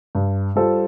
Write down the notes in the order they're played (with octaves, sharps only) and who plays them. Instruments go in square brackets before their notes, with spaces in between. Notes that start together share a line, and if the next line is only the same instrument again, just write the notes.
[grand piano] G2
G3 F4 A4 C5